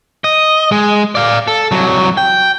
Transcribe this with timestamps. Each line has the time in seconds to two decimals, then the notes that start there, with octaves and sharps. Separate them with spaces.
0.24 D#5
0.72 G#3
1.15 D5 F5
1.48 A4
1.72 C2 F#3
2.17 G5